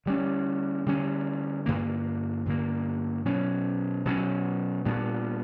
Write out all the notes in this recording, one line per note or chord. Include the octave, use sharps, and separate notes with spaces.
D3 G3 C#4
D3 G3 C#4
G2 D3 A#3
G2 D3 A#3
B2 F#3 C#4
B2 F#3 C#4
A#2 G3 B3 D4